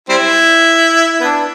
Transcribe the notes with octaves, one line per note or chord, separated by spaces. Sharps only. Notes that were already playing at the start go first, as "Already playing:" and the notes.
G3 C4 E4
B3 D4